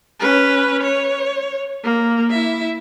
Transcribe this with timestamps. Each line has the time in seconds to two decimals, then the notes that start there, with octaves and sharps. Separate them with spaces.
0.20 C#4 B4
0.83 C#5
1.84 A#3
2.30 E4 E5